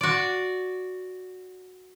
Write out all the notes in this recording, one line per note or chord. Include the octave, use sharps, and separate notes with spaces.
F#4 D5